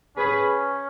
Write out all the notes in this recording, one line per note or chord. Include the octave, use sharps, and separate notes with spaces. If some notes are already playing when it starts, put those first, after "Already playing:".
C#4 G#4 B4